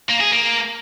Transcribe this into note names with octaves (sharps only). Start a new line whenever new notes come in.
A#3
G#4
A#3